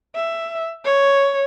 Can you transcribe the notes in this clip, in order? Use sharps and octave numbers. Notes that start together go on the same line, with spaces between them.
E5
C#5